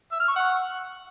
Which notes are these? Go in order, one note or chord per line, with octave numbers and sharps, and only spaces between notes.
E5
F6
C#6
F#5